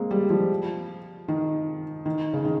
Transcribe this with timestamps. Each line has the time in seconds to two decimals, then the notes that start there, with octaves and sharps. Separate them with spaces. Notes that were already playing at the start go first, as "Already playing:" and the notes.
Already playing: G#3 A#3 C4
0.11 G3
0.30 F3
1.28 D#3
2.06 D#3
2.33 C#3
2.45 D#3